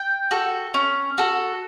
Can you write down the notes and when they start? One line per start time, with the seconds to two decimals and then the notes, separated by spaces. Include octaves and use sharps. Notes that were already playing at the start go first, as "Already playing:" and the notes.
Already playing: G5
0.31 F#4 A4
0.74 C#4
1.18 F#4 A4